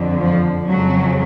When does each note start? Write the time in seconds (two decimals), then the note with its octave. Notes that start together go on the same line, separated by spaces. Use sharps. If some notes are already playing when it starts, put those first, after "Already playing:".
Already playing: F2 D3
0.22 F3
0.67 F2 C#3 F3 F#3